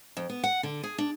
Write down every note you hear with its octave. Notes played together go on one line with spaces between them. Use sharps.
F2
B3
F#5
D3
G#4
D4